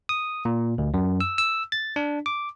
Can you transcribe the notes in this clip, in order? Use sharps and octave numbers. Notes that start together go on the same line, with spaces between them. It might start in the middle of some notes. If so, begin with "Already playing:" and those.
D#6
A#2
D2
F#2
E6
E6
A6
D4
D6